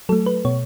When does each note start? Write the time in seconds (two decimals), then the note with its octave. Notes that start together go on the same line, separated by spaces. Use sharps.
0.09 F#3 A4
0.12 A3
0.26 B4
0.45 B2 C#5